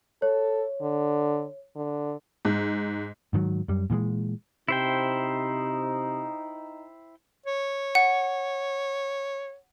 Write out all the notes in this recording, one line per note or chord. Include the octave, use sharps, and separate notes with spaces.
A4 C#5
D3
D3
G#2
G#2 D#3 F3 F#3
F#2 G3
A#2 E3 G3 G#3
C3 D#4 E4 C5 G5
C#5
F#5